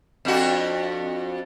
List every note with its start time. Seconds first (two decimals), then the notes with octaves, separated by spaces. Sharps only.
0.25 F2 D4 F#4